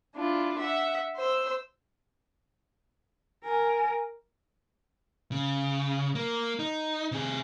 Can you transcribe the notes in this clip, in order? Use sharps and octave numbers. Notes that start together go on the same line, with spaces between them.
D4 E4 F4
E5 F#5
C5 E6
A#4 G#5
C#3
A#3
D#4
C3 G#4